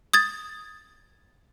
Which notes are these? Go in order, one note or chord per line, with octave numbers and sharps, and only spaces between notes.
D#6 G#6 A6